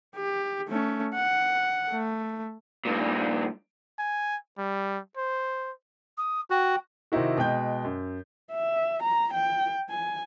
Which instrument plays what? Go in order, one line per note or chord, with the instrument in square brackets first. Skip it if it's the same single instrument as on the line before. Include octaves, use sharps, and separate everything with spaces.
[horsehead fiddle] G4
A3 C#4
F#5
A3
[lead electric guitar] G2 A#2
[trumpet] G#5
G3
C5
[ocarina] D#6
[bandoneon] F#4 [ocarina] G5
[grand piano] C3 D#3 C4 D#4 E4 F#4
B2 G#3 G5 G6
F#2
[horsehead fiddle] E5
A#5
G5
G#5